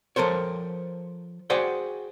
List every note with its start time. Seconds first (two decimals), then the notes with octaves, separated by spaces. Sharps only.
0.16 F3 A4 A#4 C5 C#5
1.50 F#4 G#4 C5 D5 F#5 G5